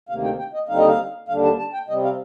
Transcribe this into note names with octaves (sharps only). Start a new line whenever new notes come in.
D2 C3 D#3 A#3 F5
G5
G5
D#5
D#2 D3 G3 C4 D#4 F5
D#5
F5
D#2 D3 G3 D4 F5
A5
A5
G5
C3 G3 C4 D#5
F5